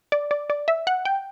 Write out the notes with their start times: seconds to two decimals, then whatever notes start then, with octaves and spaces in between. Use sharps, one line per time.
0.12 D5
0.31 D5
0.50 D5
0.68 E5
0.87 F#5
1.05 G5